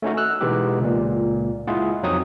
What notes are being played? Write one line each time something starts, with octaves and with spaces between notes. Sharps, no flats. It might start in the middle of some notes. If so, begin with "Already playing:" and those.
A3 C#4 D#4 F#4
E6 F#6
B2 E3 G#3 B3 D#4 G4
C#2 A#2
G#3 E4 F4 G#4 F#5
F2 F#3 C4 D#4 C#5 D#6